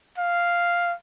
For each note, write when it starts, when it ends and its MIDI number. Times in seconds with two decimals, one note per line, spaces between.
0.18 0.94 77